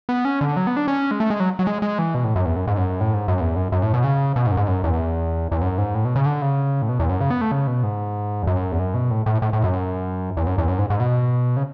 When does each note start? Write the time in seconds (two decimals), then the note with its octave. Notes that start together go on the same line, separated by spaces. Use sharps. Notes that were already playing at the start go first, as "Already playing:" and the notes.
0.09 B3
0.25 C#4
0.41 D3
0.57 F#3
0.67 B3
0.77 D4
0.88 C#4
1.11 G#3
1.20 A3
1.30 G#3
1.40 F#3
1.59 F#3
1.67 G#3
1.82 G#3
1.99 E3
2.15 B2
2.24 A2
2.36 F#2
2.46 E2
2.56 F#2
2.67 G#2
2.78 F#2
3.01 A2
3.14 G#2
3.28 F#2
3.41 E2
3.56 F#2
3.72 F#2
3.83 A2
3.94 B2
4.04 C#3
4.36 B2
4.47 G#2
4.51 F#2
4.57 G#2
4.68 F#2
4.84 E2
5.52 E2
5.62 F#2
5.78 G#2
5.95 A2
6.05 B2
6.16 C#3
6.26 D3
6.42 C#3
6.82 A2
6.89 B2
6.99 E2
7.10 F#2
7.21 C#3
7.30 B3
7.41 A3
7.52 C#3
7.67 B2
7.83 G#2
8.43 E2
8.47 F#2
8.72 E2
8.79 F#2
8.94 B2
9.11 A2
9.26 A2
9.42 A2
9.53 A2
9.64 F#2
10.37 E2
10.47 F#2
10.58 E2
10.69 F#2
10.79 G#2
10.90 G#2
11.00 B2
11.57 C#3